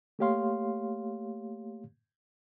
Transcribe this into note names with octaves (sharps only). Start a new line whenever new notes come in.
A3 A#3 G4 C#5 F5 C6